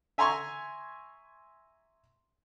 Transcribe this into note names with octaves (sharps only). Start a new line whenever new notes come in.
E5 G#5 A#5 C6 C#6 E6